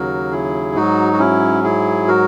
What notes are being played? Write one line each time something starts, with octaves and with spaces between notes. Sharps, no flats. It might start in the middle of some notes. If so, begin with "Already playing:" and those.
Already playing: D#2 C#3 F#3 F#4 A#4
E4 G#4
G#2 F#3 D#4 F#4
F#4
C#4 E4
E4 G#4
F#4 A#4